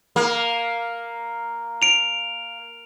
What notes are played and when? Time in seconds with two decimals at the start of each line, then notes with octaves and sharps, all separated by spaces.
0.16 A#3
1.82 D7 F7